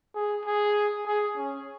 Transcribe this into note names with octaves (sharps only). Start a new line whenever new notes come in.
G#4
G#4
G#4
C#4